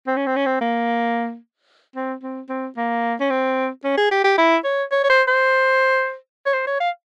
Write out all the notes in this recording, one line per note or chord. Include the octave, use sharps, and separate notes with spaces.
C4
C#4
C4
C#4
C4
A#3
C4
C4
C4
A#3
C#4
C4
C#4
G#4
G4
G4
E4
C#5
C#5
C#5
C5
C5
C#5
C5
C#5
F5